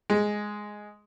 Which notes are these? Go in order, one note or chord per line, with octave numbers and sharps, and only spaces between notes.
G#3